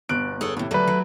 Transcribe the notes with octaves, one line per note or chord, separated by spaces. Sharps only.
G1 B2 F#6 D7
G#4 A4 C#5
D#2 A2 C3
G2 D3 F#3 A3 B4
F#3